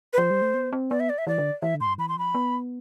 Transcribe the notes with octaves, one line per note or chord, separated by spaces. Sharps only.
B4
F3 C5
G3
A3
B3
C4
B3 D5
E5
D5
E5
E3 D5
D3
E3 E5
D3
A2 C6
G2
E3 B5
C6
F3 B5
B3